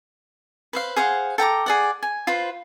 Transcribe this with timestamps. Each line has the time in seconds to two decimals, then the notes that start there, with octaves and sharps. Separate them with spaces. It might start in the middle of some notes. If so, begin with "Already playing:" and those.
0.73 B4 C5 F5
0.96 G#4 C5 F5 F#5
1.38 A4 G5 A#5 D6
1.66 G#4 D5 F#5
2.02 G#5
2.27 F4 B4 C5